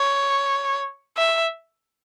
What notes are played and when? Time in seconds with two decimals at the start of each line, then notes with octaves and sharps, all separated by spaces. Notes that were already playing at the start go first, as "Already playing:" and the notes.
Already playing: C#5
1.17 E5